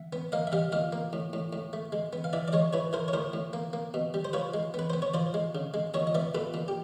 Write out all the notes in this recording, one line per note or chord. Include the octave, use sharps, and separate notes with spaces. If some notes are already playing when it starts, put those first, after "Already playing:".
Already playing: E5 F#5
B3
A#3 D#5 F5
E5
G3 D#5 F5
A#2 D#5 F5
A#3
A2
A2
A2
A3
G#3
B3
F5
E3 D5 E5
D5
G#3 C#5 D#5
E3 B4 C#5
E3 A#4 C5
C#5
A2 A#4 C5
A2
A#3
A#3
B2
G3
C5
F3 B4 C#5
G#3
B3 B4
B3 C5
C#5
F3 C5 D5
G#3
C#3
G#3
A#2 C#5 D#5
D#5
B3 D5 E5
A#2 A4 B4
A#2
G4